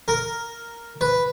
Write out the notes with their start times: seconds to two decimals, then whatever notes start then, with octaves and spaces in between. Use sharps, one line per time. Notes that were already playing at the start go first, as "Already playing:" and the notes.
0.08 A#4
1.01 B4